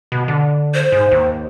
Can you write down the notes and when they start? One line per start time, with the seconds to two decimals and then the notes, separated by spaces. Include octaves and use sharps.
0.12 B2
0.28 D3
0.74 C5
0.92 G#2
1.11 D#2